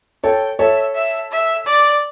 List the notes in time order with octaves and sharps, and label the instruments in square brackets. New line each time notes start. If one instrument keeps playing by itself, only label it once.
[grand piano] A4 C#5 [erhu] G5
[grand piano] A4 C#5 [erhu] E5
[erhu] E5
E5
D5